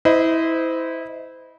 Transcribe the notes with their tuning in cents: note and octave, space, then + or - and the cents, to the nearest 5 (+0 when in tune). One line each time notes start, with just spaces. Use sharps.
E4 -20 C5 -30 D#5 +0